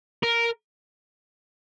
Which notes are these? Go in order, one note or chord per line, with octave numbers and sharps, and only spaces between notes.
A#4